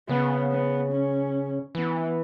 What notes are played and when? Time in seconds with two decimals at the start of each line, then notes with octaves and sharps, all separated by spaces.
0.08 C#3 B3
0.51 B3
0.92 C#4
1.75 E3 B3